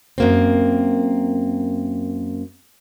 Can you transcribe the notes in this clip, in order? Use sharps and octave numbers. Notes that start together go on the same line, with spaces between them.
F#2 A#3 C4